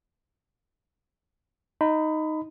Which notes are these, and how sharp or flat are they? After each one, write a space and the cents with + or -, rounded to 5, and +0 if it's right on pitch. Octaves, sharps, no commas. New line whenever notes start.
D#4 +0 B5 +25